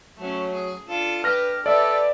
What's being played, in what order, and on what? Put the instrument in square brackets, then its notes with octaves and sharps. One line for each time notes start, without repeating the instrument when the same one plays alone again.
[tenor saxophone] F#3 [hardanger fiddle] A3 C#4
[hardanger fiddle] G#4
[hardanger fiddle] D4 A4 [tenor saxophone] F4
[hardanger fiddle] G4 [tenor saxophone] B4 [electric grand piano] F6 A#6
[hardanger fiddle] G4 B4 [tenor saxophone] A4 [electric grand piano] D5 E5